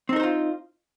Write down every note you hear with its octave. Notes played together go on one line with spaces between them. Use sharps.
C4 D#4 F4 A#4 C5